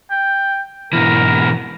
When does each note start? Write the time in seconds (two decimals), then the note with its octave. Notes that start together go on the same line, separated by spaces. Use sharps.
0.10 G5
0.93 G#2 B2 E3 A#4